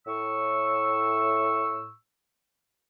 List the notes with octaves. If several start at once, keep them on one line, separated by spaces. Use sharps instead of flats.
A2 C#6 E6